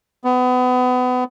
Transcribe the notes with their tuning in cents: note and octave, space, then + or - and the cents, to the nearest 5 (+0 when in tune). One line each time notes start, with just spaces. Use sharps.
B3 +30